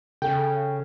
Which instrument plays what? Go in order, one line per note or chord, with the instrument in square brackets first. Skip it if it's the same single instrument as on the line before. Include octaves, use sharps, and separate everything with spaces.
[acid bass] C#3 [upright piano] A4 [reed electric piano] G5